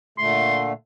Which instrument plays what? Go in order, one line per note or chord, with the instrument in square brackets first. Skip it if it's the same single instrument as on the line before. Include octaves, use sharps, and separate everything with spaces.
[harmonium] A#2 D3 A3 [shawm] C6